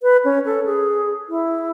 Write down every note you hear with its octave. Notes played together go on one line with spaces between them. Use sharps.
B4
C#4
A4
G#4
E4